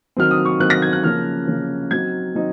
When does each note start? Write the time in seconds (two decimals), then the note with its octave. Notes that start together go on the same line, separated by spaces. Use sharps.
0.17 D#3 F#3 C4 F6
0.31 D#6
0.45 C#6
0.60 D#3 F#3 C4 F#6
0.70 A#6
0.82 G#6
0.93 F#6
1.03 C#3 F3 A#3 C#4 F6
1.47 C#3 F3 A#3 C#4
1.91 F#3 C4 D#4 G#6
2.35 F#3 C4 D#4